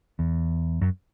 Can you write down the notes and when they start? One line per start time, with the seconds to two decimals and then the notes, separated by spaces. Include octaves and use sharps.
0.19 E2
0.81 F#2